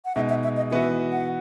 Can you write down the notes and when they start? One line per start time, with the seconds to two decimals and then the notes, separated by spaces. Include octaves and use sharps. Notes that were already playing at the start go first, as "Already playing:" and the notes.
0.05 F#5
0.15 B2 G#3 D#4 E5
0.29 E5
0.44 E5
0.57 D#5
0.71 E3 B3 F#4 E5
1.12 F#5